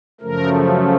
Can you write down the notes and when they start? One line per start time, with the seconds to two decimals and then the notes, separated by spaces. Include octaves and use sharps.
0.21 F#2 C#3 F3 A3 A#4